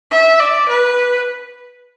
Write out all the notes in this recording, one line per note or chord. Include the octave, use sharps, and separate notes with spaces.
E5
D5
B4